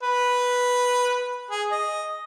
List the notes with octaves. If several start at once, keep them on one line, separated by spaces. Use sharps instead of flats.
B4
G#4
D#5